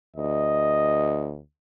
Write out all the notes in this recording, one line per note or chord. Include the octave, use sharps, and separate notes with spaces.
D2 D#5